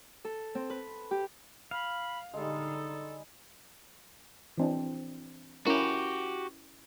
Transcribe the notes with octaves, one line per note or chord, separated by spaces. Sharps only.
A4
C4
B4
G4
F5 B5
D3 G3 G#3 D#4 A4
E3 C4 D4
C#4 E4 F#4 G4 A#4